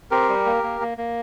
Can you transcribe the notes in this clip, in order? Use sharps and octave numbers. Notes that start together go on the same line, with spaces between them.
C4 G4 A#4
G3
A#3
A#3
A#3
A#3